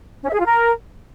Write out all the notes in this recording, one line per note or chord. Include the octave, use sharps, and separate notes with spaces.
C#4
E5
G#4
F4
A#4